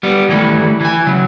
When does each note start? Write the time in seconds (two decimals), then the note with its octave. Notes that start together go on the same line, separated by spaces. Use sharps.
0.03 G3 B3
0.29 D#3 E3 G3 A3
0.81 E3 G#5
1.07 C#3 F#3